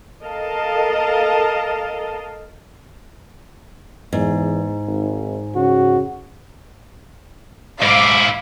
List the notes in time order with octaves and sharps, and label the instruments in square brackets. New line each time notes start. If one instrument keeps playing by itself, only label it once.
[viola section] A4 A#4 D#5 F5 A5
[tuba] E2 [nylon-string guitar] G#2
[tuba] G#1
[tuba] C#3 [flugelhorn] F#4
[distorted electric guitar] G#2 E4 [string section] F5 D6